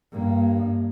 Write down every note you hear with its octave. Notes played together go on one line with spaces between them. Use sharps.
G2 A#3